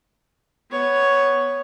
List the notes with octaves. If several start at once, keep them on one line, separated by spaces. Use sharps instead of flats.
B3 C#5